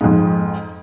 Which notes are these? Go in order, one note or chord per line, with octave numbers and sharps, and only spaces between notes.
F2 G#2